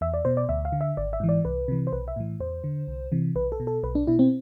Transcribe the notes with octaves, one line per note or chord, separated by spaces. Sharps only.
E2 E5
D5
B2 C5
D5
D2 E5
F5
D3
E5
G#1 D5
E5
G#2 E3
D5
C2 B4
C3 E3
C5
B1 B4
E5
A2 E3
E2 C5
D3
C2
C3 E3
B1 B4
A4
B2
A4
B1 B4
D4
B2 E4
C4